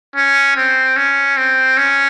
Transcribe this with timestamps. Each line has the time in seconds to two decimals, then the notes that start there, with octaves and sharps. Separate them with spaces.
0.16 C#4
0.57 C4
0.96 C#4
1.37 C4
1.77 C#4